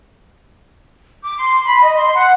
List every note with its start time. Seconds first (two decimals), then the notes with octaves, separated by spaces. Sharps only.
1.23 D6
1.38 C6
1.65 B5
1.82 D#5
1.96 C6
2.15 F#5